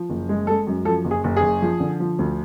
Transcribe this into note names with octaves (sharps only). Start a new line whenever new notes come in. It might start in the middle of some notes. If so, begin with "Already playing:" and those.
Already playing: F3
F#1
G#3
G#3 A4
F#2
F3 A4
F#1
G#4
F#1
G#4
F#1
F3
D3
F3
D2